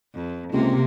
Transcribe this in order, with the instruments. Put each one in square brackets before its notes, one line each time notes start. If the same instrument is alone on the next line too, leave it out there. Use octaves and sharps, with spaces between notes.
[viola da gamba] F2
[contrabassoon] C#2 [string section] C3 [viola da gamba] A#3